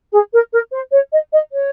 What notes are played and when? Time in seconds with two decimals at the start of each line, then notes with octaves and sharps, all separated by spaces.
0.13 G#4
0.33 A#4
0.52 A#4
0.72 C5
0.92 C#5
1.12 D#5
1.32 D#5
1.52 C#5